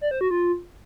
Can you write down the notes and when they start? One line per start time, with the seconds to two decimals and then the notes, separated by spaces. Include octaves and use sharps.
0.01 D5
0.11 C5
0.21 F#4
0.31 F4